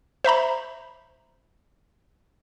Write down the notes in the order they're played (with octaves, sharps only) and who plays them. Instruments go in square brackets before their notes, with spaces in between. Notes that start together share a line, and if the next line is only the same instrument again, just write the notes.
[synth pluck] C5 E5 A#5 B5